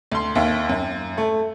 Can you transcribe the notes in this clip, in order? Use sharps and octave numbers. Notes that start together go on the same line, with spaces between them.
D2 C6
D#2 E5 F5
F#2
A3